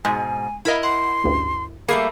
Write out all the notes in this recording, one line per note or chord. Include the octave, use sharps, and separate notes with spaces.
G#2 B2 G#3 G#5
E4 A#4 D#5 F5 B5
F#5 C6
A1 D2 G2
G3 A3 A#3 G#4 B5 C7 C#7